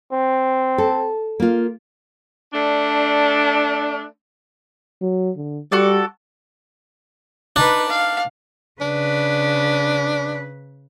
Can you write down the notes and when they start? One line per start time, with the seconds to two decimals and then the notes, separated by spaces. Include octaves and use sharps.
0.12 C4
0.78 A4
1.40 A#3 F4
2.54 A3 D4
5.02 F#3
5.37 D3
5.72 G3 F#4 A4 D5
7.56 D4 D#4 B4
7.89 F5
8.81 C#3 D4 B4